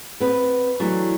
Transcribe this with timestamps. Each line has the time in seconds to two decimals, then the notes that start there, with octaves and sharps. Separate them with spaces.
0.20 B3 C4 B4
0.79 E3 F#3 A3 D4